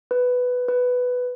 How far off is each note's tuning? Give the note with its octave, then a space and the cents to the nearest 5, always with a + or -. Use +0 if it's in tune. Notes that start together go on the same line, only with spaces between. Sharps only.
B4 +5
B4 +5